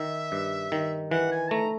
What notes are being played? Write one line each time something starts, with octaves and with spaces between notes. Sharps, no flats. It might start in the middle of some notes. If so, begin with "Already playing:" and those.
Already playing: D#3 E5
G2
D#3
E3 F#5
G#5
A3 A#5